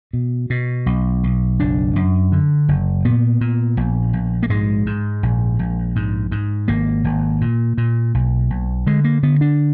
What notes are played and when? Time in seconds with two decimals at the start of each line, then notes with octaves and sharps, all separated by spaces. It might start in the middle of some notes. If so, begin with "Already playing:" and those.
0.13 B2
0.50 B2
0.86 B1
1.23 B1
1.59 F#1 D4
1.96 F#2
2.32 D3
2.68 F#1
3.05 A#2 B3
3.41 A#2
3.77 A#1
4.13 A#1
4.43 A#3
4.50 G#2 G#3
4.86 G#2
5.23 A#1
5.59 A#1
5.96 G#2
6.31 G#2
6.68 G#1 A#3
7.04 G#1
7.41 A#2
7.78 A#2
8.14 B1
8.50 B1
8.87 D3 G#3
9.04 A#3
9.23 D3 B3
9.41 D4